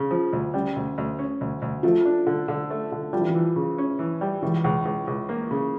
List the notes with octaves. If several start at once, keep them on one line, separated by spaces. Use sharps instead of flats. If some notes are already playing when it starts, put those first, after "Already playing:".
Already playing: C#3
F3
D2
C#3 G3
D2
D2
C#4
D2
D2
F3 A3
D4
D3
D3
A3
D3
F3 G3
E3
F3
E3
C#3
C#4
E3
G3
C#2 E3
C#2
C#2
C#2
A#3
C#3